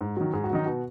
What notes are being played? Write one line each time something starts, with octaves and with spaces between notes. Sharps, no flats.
G#2
D#3 F#3 F#4
G#2 G#4
F#4
D#3 F#3 D#4
B2 F#4